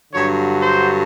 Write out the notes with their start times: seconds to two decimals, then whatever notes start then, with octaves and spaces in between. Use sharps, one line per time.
0.12 G2 D3 F#3 C#5
0.59 C5